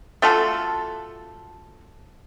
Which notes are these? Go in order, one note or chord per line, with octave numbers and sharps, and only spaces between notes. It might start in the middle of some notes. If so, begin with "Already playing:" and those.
A3 F4 F#4 A4